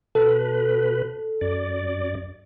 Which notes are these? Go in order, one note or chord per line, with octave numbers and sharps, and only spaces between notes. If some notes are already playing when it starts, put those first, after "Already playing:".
B2 A4 B4
F#2 D5